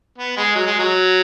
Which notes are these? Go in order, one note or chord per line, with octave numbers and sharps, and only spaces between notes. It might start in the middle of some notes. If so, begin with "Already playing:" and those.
B3
G#3
F#3
G#3
F#3